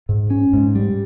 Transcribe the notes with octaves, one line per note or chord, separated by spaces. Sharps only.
G#2
C#4
G#2
G3